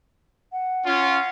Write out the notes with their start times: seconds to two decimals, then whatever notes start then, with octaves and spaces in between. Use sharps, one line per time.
0.52 F#5
0.86 C#4 F4